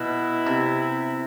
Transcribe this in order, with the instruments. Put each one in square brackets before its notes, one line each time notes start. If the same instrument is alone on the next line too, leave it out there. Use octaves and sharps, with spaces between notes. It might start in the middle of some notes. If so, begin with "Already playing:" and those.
Already playing: [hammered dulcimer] B2 [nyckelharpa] E4
[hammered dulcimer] C3